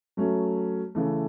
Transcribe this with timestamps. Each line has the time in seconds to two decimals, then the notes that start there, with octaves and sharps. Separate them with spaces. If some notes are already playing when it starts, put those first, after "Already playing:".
0.17 F#3 A3 C#4
0.95 C#3 E3 A3